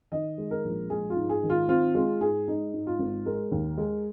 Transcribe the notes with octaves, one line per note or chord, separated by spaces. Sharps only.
D#3 D#5
G#3
A#4
A#1
G#3 G#4
F4
G#2
G#4
D#3
F4
C4 F4
G#3 F4
G#2 G#4
G#3 D#4
G#2
F4
G#1
G#3 A#4
D#2
G#3